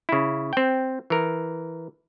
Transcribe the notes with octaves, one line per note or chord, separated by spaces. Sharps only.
C#3 E4
C4 G5
E3 A#4